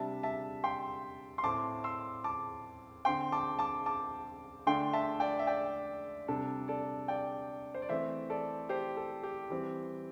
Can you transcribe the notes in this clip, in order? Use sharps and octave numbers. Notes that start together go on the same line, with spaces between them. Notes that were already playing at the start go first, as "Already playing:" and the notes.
Already playing: C3 G3 D4 E5 A5
E5 A5
G5 C6
C6
A2 A3 C4 A5 D6
C6 E6
A5 D6
D3 C4 G5 C6
A5 D6
A5 D6
A5 D6
D3 A3 D4 G5 C6
E5 A5
D5 G5
E5
D5 G5
C3 G3 D4 A4
A4 D5
D5 G5
C5
D5
E3 A3 C4 C5 E5
A4 D5
G4 C5
A4
G4
E3 G3 C4